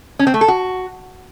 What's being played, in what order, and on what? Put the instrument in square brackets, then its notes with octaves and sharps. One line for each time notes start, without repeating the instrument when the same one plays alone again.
[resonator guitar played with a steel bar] C#4
C4
A3
A4
F#4